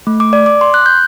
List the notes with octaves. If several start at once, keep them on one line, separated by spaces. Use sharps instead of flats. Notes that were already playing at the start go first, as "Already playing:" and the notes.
A3
D6
D5
D6
C6
F#6
G6